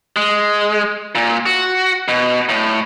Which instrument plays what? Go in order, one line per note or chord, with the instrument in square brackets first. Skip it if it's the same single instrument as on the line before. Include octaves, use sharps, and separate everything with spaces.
[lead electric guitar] G#3
A#2
F#4
B2
A2